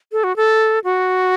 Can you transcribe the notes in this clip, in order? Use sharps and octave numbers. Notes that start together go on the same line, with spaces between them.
A4
F#4
A4
F#4